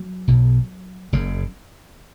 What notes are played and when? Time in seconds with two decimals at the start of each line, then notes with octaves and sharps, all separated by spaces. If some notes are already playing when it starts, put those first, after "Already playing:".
Already playing: F#3
0.28 B1 B2
1.13 F#1 F#2 C#3